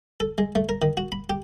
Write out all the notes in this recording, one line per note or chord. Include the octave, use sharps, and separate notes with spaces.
A4
G#3
A3
A#4
D#3
F#4
B5
G4